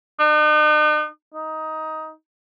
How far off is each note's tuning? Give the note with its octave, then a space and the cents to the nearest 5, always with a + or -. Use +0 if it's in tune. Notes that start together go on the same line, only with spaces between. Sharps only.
D#4 -45
D#4 +15